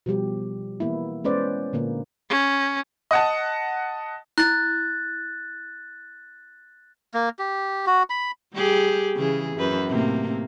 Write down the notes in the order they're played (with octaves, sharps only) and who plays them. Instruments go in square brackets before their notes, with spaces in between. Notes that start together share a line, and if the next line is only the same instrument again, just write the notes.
[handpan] B2 F3 G3 G4
E3 A#3 B3 E4
G#3 B3 C#4 B4 C5 D5
A#2 D3 A#3
[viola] C#4
[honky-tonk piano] D#5 F#5 A5
[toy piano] E4 [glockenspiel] F#6 A6
[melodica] A#3
G4
F#4
B5
[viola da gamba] G3 G4 G#4
C#3 E3 G#4
F#2 B4
A2 C3 A#3